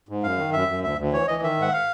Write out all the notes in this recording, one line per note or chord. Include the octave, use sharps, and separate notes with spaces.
G#2
F#2 F5
D#3
F#2 E5
F#2
D2 E5
D2
E3 C#5
E3 D#5
D#3 E5
G#2 F#5
F5